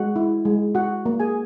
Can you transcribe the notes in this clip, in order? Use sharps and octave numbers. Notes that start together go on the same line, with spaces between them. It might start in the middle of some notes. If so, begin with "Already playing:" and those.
Already playing: G#3 F#4 F#5
E4
G#3
F#4 F#5
A#3
G#4 G#5